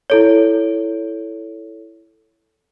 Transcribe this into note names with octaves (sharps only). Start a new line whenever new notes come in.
E4 A4 C#5